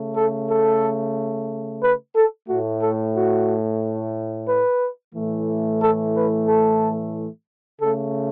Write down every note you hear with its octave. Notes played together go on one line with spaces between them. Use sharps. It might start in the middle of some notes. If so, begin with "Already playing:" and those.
Already playing: C#3 A3
A4
A4
B4
A4
A2 A3 F#4
A4
F#4
B4
A2 E3 A3
A4
B4
A4
C#3 A3 A4